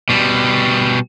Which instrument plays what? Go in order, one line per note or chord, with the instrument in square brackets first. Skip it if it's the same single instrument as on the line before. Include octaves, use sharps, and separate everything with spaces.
[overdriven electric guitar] B2 G3